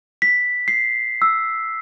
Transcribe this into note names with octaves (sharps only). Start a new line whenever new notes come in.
B6
C7
E6